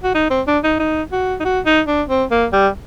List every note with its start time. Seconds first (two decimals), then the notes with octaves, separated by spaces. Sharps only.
0.03 F#4
0.15 D#4
0.30 C4
0.47 D4
0.64 D#4
0.80 D#4
1.12 F#4
1.40 D#4
1.45 F#4
1.66 D#4
1.87 D4
2.09 C4
2.31 A#3
2.53 G3